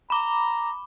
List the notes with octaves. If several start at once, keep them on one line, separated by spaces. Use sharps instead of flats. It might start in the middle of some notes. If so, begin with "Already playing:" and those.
A#5 B5 D6